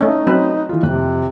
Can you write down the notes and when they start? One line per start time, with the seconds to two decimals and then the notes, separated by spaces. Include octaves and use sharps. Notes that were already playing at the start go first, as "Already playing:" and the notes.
0.01 A3 C#4 D#4 D#5
0.27 F#3 C4 B4
0.69 E3 F4
0.83 F2 C3 F#6